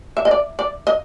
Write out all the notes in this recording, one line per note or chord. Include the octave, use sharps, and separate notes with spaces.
E5
D#5
D5
D5
D#5